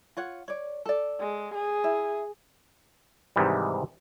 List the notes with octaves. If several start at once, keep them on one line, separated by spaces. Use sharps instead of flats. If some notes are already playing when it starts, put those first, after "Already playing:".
F4 C#5 F#5
C#5 D5
A4 D5
G#3
G#4
E4 E5
G#2 C3 D#3 E3 G3